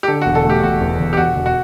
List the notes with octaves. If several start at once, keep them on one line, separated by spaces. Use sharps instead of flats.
G4
D3 A4
F#4
E1
A4
A3
G4
E1 F#4
E2
E1
G4
E1 F#4
E1
F#4